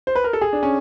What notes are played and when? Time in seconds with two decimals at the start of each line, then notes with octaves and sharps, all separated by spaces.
0.07 C5
0.16 B4
0.24 A#4
0.33 A4
0.41 G#4
0.53 D4
0.63 C#4